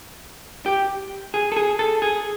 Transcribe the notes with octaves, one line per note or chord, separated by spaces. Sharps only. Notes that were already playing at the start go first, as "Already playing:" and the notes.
G4
G#4
A4
G#4
A4
G#4